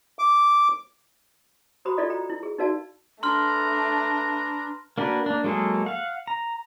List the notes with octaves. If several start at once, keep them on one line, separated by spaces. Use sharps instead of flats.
D6
F#4 G4 C5 A#5 B5 D#6
E4 F4 A4 D5 D#5 F5
C5 G5 A#5
E4
G#4
D#4 F#4 A#4 D5 F5 A5
A3 D4 B4 A#5 C6 F6
A#3 D4 F#4 A#4 B4
A#3 D4
F#3 G#3 A#3 G#4 A4
F5 F#5
A#5